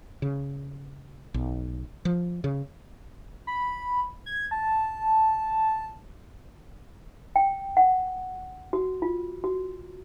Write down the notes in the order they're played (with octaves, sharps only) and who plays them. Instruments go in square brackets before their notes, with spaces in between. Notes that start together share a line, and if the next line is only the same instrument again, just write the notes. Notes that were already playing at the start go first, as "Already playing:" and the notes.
[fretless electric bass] C#3
B1
F3
C#3
[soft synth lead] B5
G#6
A5
[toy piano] G5
F#5
F#4
F4
F#4